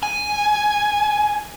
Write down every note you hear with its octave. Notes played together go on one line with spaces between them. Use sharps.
G#5